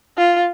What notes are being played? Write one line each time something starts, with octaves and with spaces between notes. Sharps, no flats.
F4